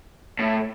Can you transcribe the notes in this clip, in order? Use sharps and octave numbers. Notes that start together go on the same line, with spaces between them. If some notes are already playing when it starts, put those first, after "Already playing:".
A2